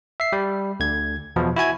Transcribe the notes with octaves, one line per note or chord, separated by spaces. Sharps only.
E5 C7
G3
D2 D3 G#6
E2 B2 F3
E4 F#4 G#5 G#6